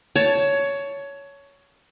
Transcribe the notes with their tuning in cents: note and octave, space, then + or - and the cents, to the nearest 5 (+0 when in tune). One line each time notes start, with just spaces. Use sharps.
C#5 +15 A5 +0